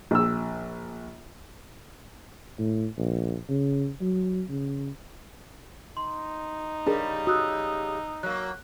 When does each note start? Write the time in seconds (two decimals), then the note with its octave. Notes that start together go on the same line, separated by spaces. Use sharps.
0.11 A#1 E6
2.59 A2
2.98 A#1
3.49 C#3
4.01 F#3
4.50 C#3
5.97 D#4 C6
6.87 C#3 G3 D4 G#4 A#4
7.27 F#4 D#6 E6 F#6
8.23 F#3 A#3 F#6